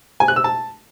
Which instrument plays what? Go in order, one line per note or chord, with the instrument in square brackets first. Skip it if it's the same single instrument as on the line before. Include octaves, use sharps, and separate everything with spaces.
[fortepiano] G#5
F#6
E6
A5